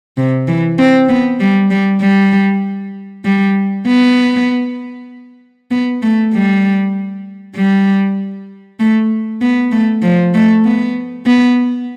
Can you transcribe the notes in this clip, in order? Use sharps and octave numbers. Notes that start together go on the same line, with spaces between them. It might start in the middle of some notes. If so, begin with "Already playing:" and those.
C3
E3
C4
B3
G3
G3
G3
G3
B3
B3
A3
G3
G3
A3
B3
A3
F3
A3
B3
B3